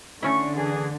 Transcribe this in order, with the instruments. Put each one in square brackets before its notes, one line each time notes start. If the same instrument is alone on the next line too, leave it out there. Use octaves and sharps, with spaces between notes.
[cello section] D3 [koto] A3 C#4 E4 [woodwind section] C#6
[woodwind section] E3 G#4